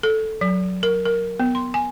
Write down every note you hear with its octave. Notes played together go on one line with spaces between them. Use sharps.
A4
F#3
A#4
A#4
B3
C6
G#5